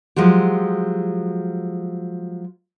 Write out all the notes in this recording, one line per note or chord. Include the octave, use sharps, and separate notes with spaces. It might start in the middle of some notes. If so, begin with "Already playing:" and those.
F3 F#3 G#3 G4